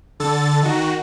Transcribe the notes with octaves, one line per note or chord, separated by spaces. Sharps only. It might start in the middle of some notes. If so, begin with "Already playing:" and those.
D3 A4 A6
D#3 F#4